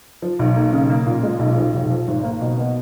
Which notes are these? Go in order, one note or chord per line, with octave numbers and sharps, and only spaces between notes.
F3
B1
A#3
C#3
A#3
A#2
G#3
B1
F3
F1
F3
G#1
A#3
B2
B3